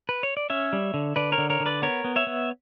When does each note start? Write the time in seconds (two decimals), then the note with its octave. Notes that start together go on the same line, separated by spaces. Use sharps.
0.09 B4
0.23 C#5
0.37 D5
0.50 C#4 C#5 E5
0.73 G3
0.94 D3
1.16 D3 B4 D5
1.32 A#4 C#5
1.38 D3
1.50 A#4 C#5
1.60 D3
1.66 B4 D5
1.82 B3 A#4 C#5
2.05 B3
2.16 C#5 E5
2.27 B3